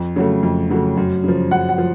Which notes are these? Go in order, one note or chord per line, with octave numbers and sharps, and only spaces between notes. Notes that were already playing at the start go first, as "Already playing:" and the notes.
Already playing: F2
C#3 F#3 A3
F2
C#3 F#3 A3
F#2
C#3 F3
F#2 F#5
F#5
F3